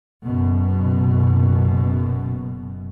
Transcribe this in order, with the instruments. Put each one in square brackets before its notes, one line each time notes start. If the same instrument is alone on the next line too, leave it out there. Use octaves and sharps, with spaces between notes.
[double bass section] F#1 F#2 B2